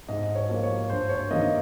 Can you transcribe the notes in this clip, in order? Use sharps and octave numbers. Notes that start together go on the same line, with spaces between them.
G#2 D#5
C#5
F3 A#3
C#5
G2 C5
C#5
D#3 A#3 D#5